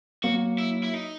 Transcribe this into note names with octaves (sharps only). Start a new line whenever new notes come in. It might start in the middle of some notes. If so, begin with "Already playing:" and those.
F#3 A#3 F#4
E4
E4
D#4